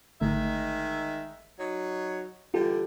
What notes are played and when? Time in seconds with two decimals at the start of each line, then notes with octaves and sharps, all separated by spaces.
0.21 G#1 D3 D#3 G#3 A3 E5
1.58 F#3 D#4 C#5
2.54 D3 E3 G3 F4 G4 A4